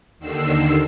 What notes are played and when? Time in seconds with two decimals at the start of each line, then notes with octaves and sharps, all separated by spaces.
0.20 D#2 D3 D#3 E6 C7